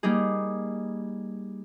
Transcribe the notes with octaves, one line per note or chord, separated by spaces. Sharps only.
G3 A#3 D#4 G#4